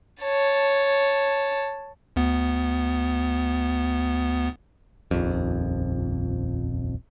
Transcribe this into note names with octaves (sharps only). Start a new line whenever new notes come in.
C#5 A5
D2 B3
D#1 A#1 F2